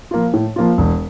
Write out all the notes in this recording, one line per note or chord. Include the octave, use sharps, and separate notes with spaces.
F3 A#3 F4
A2
F3 A#3 F4
E1